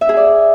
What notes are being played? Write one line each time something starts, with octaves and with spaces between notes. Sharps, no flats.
E5
G#4
D5